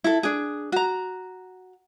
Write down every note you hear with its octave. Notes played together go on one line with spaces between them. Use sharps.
E4 A4
D4 G#4
F#4 A#5